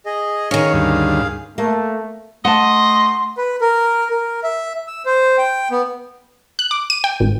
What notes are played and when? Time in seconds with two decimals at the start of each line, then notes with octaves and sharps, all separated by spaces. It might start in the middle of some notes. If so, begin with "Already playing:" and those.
0.06 G#4 D#5
0.51 D#3 C#4 G#4 C#5 F5
0.74 D2 G2
1.58 A3 A#3
2.45 A3 D#5 F#5 A5 C6
3.37 B4
3.61 A#4
4.10 A#4
4.44 E5
4.87 E6
5.06 C5
5.38 G5
5.71 B3
6.59 F#6
6.71 D6
6.90 D#7
7.04 G5
7.20 G#1